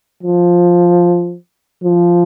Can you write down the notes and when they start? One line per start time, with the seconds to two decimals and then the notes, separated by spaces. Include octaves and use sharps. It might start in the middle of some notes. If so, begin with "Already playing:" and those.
0.23 F3
1.84 F3